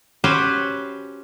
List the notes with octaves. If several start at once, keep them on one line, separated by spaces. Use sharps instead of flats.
C#4 F#4 G4 B4 C5